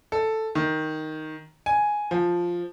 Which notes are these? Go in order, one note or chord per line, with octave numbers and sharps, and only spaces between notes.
A4
D#3
G#5
F3